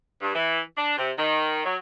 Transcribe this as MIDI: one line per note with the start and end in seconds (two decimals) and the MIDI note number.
0.22 0.35 43
0.35 0.61 52
0.77 0.97 62
0.98 1.11 48
1.18 1.63 51
1.65 1.76 54